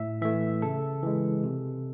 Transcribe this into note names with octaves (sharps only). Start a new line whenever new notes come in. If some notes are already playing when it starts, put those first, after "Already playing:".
Already playing: A2 E5
E3 A3 E5
C#3 A4
E3 G#3
C3